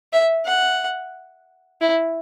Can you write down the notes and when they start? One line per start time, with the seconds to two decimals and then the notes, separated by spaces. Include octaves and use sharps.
0.13 E5
0.46 F#5
1.81 E4